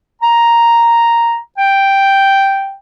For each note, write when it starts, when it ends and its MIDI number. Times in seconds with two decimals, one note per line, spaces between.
0.22 1.38 82
1.58 2.74 79